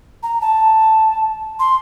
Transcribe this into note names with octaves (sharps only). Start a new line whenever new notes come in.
A#5
A5
C6